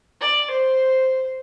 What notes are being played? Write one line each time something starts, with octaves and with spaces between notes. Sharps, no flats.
D5
C5